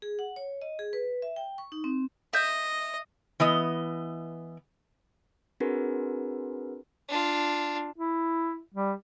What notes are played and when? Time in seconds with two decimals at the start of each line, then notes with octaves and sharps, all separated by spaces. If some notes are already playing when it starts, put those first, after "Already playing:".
0.02 G#4
0.19 F#5
0.36 C#5
0.62 D#5
0.79 G#4
0.93 B4
1.22 E5
1.36 G5
1.58 C#6
1.72 D#4
1.84 C4
2.33 D#5 E5 G6
3.40 E3 B3 D#5
5.60 C4 D4 F#4 G#4 A#4 B4
7.08 D4 F4
7.98 E4
8.74 G3